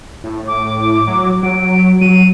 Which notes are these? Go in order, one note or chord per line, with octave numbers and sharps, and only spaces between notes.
A2
D6
F#3
F#3 D7
F#3 D#7